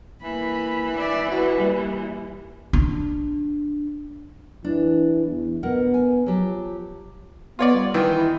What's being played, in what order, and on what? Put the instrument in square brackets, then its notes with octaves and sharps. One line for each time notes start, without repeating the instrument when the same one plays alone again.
[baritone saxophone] E3 [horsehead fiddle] A#3 B5
[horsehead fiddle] D5 E5
[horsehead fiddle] E4 B4 [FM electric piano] F#4
[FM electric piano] G3 [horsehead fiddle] A#3
[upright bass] D4
[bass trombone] E3 [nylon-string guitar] D4
[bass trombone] E2
[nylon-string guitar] B2 A#4 F#5 [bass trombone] B3
[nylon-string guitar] G#5
[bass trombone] F3 [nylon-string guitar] F#3 G4 A5
[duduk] B3 [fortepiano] F4 C#5 D5
[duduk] G3
[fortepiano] D#3 E3 F4
[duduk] E4